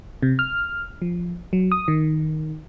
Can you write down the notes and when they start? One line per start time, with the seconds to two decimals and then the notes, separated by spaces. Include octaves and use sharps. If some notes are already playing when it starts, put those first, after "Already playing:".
0.22 C3
0.39 F6
1.02 F3
1.53 F#3
1.72 D#6
1.88 D#3